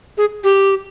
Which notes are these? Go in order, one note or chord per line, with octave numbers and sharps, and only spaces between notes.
G#4
G4